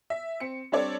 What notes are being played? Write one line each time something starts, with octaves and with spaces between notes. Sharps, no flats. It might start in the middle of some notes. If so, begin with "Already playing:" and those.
E5
C4 C#7
G3 C4 D4 A4 C#5 D5